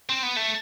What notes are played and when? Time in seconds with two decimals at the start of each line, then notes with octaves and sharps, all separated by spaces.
0.09 C4
0.23 B3
0.37 A3